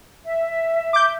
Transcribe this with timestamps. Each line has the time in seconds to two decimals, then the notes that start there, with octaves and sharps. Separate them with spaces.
0.25 E5
0.93 D6 G6